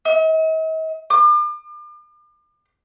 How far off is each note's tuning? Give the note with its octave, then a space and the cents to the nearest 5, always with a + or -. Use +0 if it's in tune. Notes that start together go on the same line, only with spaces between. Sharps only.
D#5 +45
D6 +40